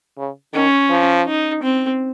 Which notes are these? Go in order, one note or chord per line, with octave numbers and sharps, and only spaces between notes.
C#3
D#3 C#4
F3
D#4
C4